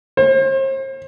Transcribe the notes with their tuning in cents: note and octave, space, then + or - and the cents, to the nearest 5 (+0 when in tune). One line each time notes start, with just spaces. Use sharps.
C5 +40